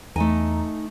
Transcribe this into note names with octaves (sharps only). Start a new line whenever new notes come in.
E2 A3 D#4 G#5 A#5